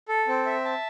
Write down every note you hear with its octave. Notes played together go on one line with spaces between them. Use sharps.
A4
C4
E5
A5